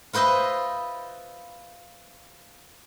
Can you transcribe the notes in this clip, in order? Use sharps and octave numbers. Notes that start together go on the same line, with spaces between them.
F4 B4 C5 D#5 E5